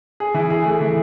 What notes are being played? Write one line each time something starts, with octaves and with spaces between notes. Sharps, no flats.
G#4
E3
G#4
A3
E3